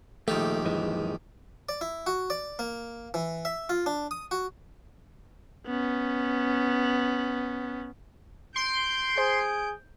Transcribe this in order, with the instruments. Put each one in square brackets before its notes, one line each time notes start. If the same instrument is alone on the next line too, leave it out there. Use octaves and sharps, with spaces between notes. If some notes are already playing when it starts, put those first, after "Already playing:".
[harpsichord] A#1 D#3 G4 [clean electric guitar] A3
[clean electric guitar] F#2 E3 G#3
[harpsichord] D5
E4
F#4
D5
A#3
E3
E5
F4
D4
D#6
F#4
[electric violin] B3 C#4
[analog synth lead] C6 [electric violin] G6 D7
[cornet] G#4 [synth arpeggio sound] C5